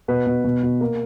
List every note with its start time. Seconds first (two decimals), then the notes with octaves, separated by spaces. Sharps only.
0.08 B2 B4
0.27 B2
0.44 B2
0.63 B2
0.81 A#3 A#4